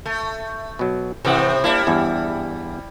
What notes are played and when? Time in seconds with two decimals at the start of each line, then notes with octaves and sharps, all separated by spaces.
0.06 A3
0.79 B2 F#3
1.25 G#1 A2 C3 E3 C4 F#5
1.64 G3 A#3 D4 E4
1.87 E2 G2